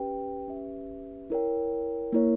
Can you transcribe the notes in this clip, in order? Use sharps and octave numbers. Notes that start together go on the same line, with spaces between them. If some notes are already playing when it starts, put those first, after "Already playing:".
Already playing: C#4 G4 B4 G5
C#4 G4 B4 E5
E4 A#4 C#5 G5
A#3 E4 A#4 C#5